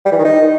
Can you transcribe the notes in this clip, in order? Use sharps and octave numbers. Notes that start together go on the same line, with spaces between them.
G3
E3
D#3
D#4